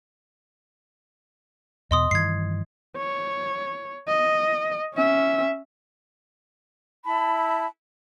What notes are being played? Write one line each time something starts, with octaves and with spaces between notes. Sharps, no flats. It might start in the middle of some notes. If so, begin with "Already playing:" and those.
E2 B2 B3 D#5 C6 D#6
G2 D#3 E3 G#6 C7
C#5
D#5
C#4 E5
E4 A5 B5